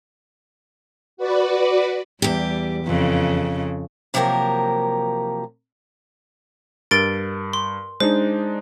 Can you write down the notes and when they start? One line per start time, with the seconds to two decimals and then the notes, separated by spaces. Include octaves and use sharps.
1.17 F#4 B4 D5
2.22 E2 G3 G4
2.86 F2 C#3
4.14 C3 F3 F#3 A#3 G4 A#4
6.91 G2 A#4 A6 D7
7.53 C6
8.00 G#3 D4 D#4 C5